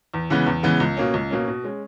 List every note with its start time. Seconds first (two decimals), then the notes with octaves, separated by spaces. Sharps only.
0.14 E2
0.30 C#3 E3 G#3 B3
0.46 E2
0.63 C#3 E3 G#3 B3
0.80 C#2
0.97 B2 A#3 C#4
1.14 C#2
1.30 B2 A#3 C#4
1.48 B2
1.64 G#3 C#4